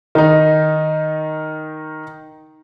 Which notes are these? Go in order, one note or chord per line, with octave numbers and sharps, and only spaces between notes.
D#3 D#4